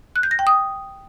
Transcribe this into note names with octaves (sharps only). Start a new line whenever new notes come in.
F#6
G6
A#6
G5
D#6